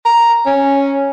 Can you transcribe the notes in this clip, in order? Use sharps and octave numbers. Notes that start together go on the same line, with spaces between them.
A#5
C#4